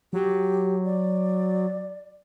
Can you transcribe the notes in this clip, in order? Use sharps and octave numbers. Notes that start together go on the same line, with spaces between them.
F#3 G4
D5